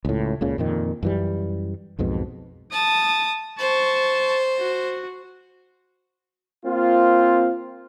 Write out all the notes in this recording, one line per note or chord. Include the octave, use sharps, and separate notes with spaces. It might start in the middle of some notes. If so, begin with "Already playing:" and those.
C#2 A2
C#2 A#2 C#3
F2 A#2 D#3
F#2 E3 G3
B1 F2 G#2 B2
A5 D#6
C5 A5 C#6
F#4
A#3 C4 F4